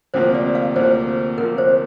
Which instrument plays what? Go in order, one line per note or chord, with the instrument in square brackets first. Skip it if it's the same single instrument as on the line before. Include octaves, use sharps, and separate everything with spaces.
[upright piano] D2 C3 F3 A#3 F4 [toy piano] C5
[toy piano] D5
F5
[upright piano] D2 C3 F3 A#3 F4 [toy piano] C5
[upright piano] D2 C3 F3 A#3 F4 [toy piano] A#4
[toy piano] C5